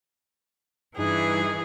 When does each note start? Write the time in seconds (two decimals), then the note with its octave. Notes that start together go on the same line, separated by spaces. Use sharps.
0.97 G2 E3 D#4 G#4 F#6